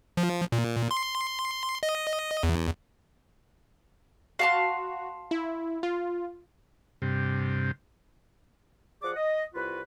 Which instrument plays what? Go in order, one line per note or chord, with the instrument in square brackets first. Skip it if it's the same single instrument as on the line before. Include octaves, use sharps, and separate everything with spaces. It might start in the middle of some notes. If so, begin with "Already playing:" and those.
[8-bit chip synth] F3
A#2
C6
D#5
E2
[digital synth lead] F#4 [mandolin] F5 A5 C6
[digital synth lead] E4
F4
[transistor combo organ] G2 C3
[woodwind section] F3 G#4 D5 F#5 D6
D#5
C2 F4 F#4 B4